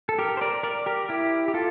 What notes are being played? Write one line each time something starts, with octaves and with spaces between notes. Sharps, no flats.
A4
G4 A#4
C5
A#4 D5
A#4 D5
G4 A#4
E4 G4
G4
F4 A4